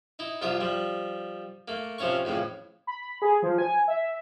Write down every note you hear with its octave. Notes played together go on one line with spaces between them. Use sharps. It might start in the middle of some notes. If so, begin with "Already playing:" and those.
D#4 E4
C2 F2 F4 G4 E5 D#6
F3 G3
A3 A#3
C3 F3 C#4 F5 C#6
F2 A2 C#3 E3
B5
G#4
F3
G#5
E5